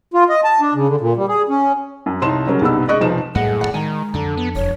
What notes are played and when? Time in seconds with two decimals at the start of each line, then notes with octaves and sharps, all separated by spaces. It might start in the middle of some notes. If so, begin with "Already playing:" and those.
0.14 F4
0.29 D#5
0.44 A5
0.61 D4
0.74 C#3
0.88 D3
1.01 A#2
1.16 G3
1.28 G#4
1.49 C#4
2.06 F#2
2.22 C2 D#4 C#5 A5 C6 E7
2.47 C#3 F#3 G3 C#4 A#4
2.61 B1 G2 C3 B3 D#4 E6
2.88 C#3 G#3 D5 D#5 C#6 F#6
3.01 F1 B1 F3 D#4 C5 E7
3.35 F#2 A2 G3 A#3 G#4 B4 D#5 F#5
3.61 D1 F#2 F3 D5 F#5
3.74 D#3 G#3 G#5 A#5
4.14 F2 D3 D4 A4
4.37 B3
4.56 E1 C#5